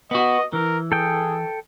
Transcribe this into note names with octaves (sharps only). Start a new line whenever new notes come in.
B3 F#4 D#5
E3 A#4
G#4 A4 G5